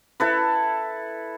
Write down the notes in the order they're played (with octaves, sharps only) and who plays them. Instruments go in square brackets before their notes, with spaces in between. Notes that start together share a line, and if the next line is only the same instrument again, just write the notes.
[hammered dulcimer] E4 A4 B4